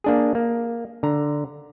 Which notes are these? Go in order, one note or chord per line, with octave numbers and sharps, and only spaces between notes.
A#3 D4 G#4
A#3
D3 A#5